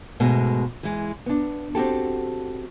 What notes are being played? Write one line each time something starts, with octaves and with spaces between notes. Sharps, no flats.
G#2 B2 G#3 A3
E3 G#3
B3 D4
C4 F#4 G4 A4